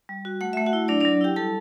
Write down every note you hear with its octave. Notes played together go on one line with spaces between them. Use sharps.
G3
F#4
A3 F#5
A3 E5
F#4 F#5
E4
F#3 D4 D5
D4 D5
F#3
E4 G4 G5
G3 A4 A5